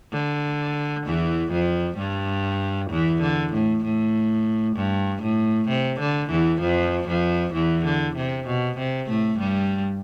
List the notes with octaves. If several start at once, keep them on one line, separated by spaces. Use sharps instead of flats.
D3
E2 E3
F2 F3
G2 G3
E2 E3
D3
A2
A2
G2
A2
C3
D3
E2 E3
F2 F3
F2 F3
E2 E3
D3
C3
B2
C3
A2 A3
G2 G3